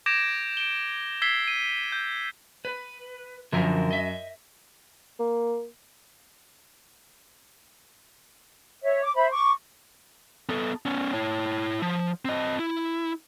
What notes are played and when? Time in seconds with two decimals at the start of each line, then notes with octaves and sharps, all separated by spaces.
0.06 D6 G6 G#6 A#6 D7 E7
0.57 D7 G7
1.22 E6 G#6 B6 C7 G7
1.48 D#7
1.92 G6
2.65 B4
3.53 F#2 D3 F3 A#4
3.91 D#5 E5
5.19 A#3
8.83 C#5 E5
9.03 D6
9.15 C5 E5 B5
9.31 C#6 D6
10.49 B3 A4
10.86 B3 C#4
11.13 E4 C#5
11.82 F3
12.25 C4 D#5
12.59 E4